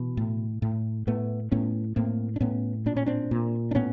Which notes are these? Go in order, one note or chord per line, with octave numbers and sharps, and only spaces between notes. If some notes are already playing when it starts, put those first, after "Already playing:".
Already playing: B2 E3
A2
A2
A2 A3 B3
A2 B3 C#4
A2 A#3 C4
D4
A2 B3 C#4
A#2 D4
C#4
C4 D4
A#2
D4
A2 B3 C#4